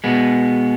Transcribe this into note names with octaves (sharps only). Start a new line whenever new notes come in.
B2 G#3 B3